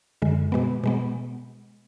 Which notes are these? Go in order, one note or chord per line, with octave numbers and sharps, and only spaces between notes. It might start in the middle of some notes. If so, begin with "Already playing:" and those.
F#2 D3 G#3
B2 G#3 B3
B2 G#3 B3